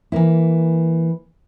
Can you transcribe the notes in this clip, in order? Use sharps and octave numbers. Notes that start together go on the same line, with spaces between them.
E3 A#3 E4